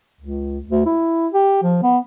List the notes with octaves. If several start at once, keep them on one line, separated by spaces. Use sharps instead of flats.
C#2
D2
E4
G4
F3
B3